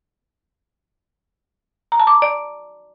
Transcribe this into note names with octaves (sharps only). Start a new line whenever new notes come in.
A#5
A5
D6
A#5
D5